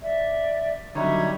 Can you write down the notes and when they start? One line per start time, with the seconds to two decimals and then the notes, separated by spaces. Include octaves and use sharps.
0.01 D5 E5
0.95 D3 F#3 G3 D#4 C#5 E5